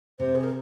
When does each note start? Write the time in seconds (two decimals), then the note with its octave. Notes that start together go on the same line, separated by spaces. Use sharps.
0.19 C3 C5
0.35 G#4
0.43 A#4